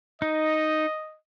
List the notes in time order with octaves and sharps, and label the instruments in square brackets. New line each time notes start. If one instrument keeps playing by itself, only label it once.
[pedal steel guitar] D#4 [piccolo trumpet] D#5